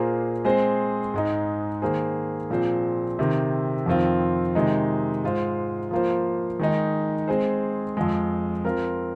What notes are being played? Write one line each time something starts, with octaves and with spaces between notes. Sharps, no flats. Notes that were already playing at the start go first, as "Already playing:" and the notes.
Already playing: A#2 A#3 F4 G#4 C5
G#3 C4 G#4 C5
G#2 G#3 D#4
D#3 A#3 G#4 C5
A#2 F3 C4 G#4 C5
C3 D#3 C4
F2 D#3 C4 F4
C3 D#3 G#3 D#4
G#2 G#3 F4 C5
F3 A#3 F4 C5
D#3 G#3 D#4
G#3 C4 G#4 C5
F2 F3 G#3
F3 C4 F4 A#4